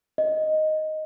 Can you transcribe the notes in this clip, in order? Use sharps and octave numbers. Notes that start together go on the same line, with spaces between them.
D#5